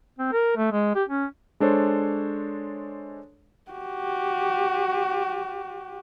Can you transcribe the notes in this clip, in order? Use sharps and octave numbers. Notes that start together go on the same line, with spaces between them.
C4
A#4
A3
G#3
G4
C#4
G#3 D4 A4 C5 C#5
F#4 G4